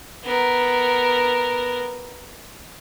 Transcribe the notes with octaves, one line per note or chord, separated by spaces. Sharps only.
B3 A#4